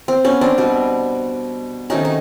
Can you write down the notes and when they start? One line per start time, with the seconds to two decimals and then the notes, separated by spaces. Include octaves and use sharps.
0.08 C4
0.25 B3 C#4
0.41 C4 D4
0.58 B2 G3 B3
1.90 C3 D#3 F#3 A3 C#4 D#4
2.05 D#4